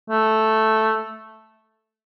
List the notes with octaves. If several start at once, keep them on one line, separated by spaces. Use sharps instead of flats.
A3